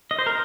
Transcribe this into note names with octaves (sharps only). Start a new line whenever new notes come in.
D#5
C5
A#4